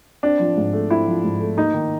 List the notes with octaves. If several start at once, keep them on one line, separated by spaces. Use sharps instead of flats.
C4 D4
F3
G#2
A3
C4 E4
F3
G#2
A3
A#3 D#4
D#3